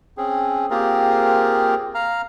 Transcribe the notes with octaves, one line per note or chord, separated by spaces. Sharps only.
C4 C#4 G#4
A#3 C4 F4 G4 G#4 A#4
F5 A#5 F6